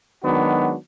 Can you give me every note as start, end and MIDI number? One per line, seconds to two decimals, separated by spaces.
0.23 0.74 51
0.23 0.74 54
0.23 0.74 56
0.23 0.74 59
0.23 0.74 62
0.23 0.74 66